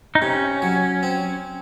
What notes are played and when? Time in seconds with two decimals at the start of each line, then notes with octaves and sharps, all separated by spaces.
0.15 D#4
0.22 C3 C#4
0.62 F#3
1.03 C4